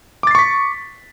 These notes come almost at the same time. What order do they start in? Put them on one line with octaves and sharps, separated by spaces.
D6 A6 C7 C#6 B6